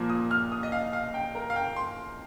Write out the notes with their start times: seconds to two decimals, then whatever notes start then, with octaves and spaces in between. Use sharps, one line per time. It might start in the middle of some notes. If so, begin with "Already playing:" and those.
Already playing: A#2 F3 A#3
0.10 D#6
0.31 F6
0.52 D#6
0.63 D#5
0.72 F5
0.93 F5
1.14 G5
1.35 A#4
1.50 F5
1.56 G5
1.76 C6